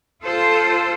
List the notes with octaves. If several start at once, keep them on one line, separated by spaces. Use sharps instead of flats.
F4 A4 C5